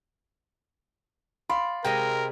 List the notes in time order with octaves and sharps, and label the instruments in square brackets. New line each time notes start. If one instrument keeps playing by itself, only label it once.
[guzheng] D5 [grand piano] F5 B5 C6
[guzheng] C3 G#3 D#5 [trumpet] A#4 [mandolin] G5